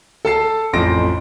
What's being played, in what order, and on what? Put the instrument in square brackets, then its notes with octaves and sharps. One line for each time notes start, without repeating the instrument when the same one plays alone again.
[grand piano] A4 A5 C7
A1 F2 C6 A#6 D7